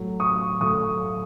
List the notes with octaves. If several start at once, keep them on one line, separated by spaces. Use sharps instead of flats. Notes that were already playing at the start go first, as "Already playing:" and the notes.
Already playing: A2 F#3 A3
C#6 D#6
A2 F#3 A3 C#6 D#6